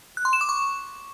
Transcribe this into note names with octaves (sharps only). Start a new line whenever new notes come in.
F#6
C6
E7
D6
C#6